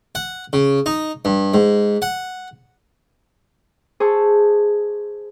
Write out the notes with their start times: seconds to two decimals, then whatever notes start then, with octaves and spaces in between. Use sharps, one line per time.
0.15 F#5
0.53 C#3
0.86 D#4
1.25 G2
1.54 G#2
2.02 F#5
4.00 G#4 C5 A5 C#6 E6